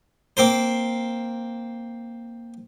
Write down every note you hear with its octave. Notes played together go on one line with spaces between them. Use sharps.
A#3 C4 A#4 C5